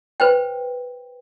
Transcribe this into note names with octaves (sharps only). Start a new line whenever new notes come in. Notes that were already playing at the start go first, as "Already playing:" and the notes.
B4 C5 G5